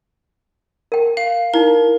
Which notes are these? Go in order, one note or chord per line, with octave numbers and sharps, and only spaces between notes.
A#4 G5
F5
D#4 E4 A#4